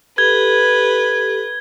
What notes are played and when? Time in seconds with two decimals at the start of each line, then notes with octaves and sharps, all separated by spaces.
0.18 G4 A4 B4 G#6 G7